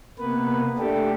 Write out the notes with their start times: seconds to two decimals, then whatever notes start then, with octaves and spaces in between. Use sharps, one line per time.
0.19 C3 A#3 B3 B4
0.79 A3 D4 G4 A4